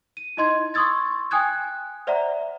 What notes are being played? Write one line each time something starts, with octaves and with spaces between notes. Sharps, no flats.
D#7
D#4 E4 D#5 C6 G#6
C6 C#6 D#6 E6 G#6 A6
G5 G#5 D#6 F#6 G#6
C5 D5 E5 F#5 A#5